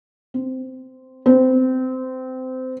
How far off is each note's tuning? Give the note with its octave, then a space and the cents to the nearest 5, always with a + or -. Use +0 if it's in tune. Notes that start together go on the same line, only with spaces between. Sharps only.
C4 -10
C4 -20